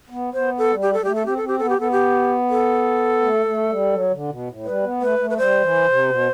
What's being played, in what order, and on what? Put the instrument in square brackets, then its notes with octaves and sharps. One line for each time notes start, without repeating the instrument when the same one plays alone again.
[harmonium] B3
[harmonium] B3 [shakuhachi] C5
[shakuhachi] A4
[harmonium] G3
[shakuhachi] G4
A4
[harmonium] G3
[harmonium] A3 [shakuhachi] G4
[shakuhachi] A4
[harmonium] C4 [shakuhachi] G4
[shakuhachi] A4
[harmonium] C4
[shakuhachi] G4
[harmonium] B3 [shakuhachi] A4
[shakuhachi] G4
[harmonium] B3 [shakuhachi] A4
[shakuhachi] G4
A4
[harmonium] A3
A3
G3
F#3
D3
B2
A2
[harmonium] G3 [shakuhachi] B4
[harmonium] B3
[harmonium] A3 [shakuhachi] B4
[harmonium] A3
[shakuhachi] B4
[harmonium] G3 [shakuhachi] C5
[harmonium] E3
C3
B2